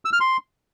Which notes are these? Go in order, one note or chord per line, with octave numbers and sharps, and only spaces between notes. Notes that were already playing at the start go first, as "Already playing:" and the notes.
E6
F6
C6